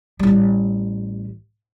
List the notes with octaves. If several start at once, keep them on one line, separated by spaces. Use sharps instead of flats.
A1 G3